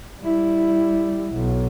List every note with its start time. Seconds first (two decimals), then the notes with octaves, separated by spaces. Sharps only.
0.21 G3 E4
1.33 B1